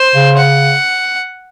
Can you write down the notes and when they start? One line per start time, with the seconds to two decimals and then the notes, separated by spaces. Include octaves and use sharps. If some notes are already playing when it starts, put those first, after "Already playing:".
Already playing: C5
0.15 C#3
0.37 F#5